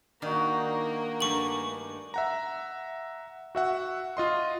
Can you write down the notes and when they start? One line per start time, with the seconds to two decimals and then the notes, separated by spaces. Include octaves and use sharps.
0.22 D#3 A#3 D4 D#4 F#4
1.20 G2 A3 G#5 C#6 F#7
2.14 E5 F#5 A#5
3.55 F#4 E5 F#5
4.17 F4 D#5 C6